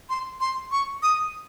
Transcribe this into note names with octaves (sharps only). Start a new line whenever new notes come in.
C6
C6
C#6
D#6